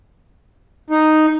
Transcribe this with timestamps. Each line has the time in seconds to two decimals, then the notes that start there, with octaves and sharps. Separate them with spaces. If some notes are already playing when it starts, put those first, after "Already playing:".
0.90 D#4